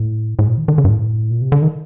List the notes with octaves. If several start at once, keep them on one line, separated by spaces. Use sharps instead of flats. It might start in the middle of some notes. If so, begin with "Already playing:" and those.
Already playing: A2
A2
A#2
D#3
D#3
D3
G2
A2
A#2
C3
D3
D#3